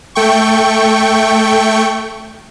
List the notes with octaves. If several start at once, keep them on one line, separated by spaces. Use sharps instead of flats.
A3 G5 C#6